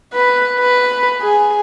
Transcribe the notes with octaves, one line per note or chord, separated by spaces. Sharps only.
B4
B4
G#4